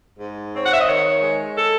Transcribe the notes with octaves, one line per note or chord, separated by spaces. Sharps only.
G#2
C4 C#5
F#5
E5
D#5
D#3 C#5
G#3
A4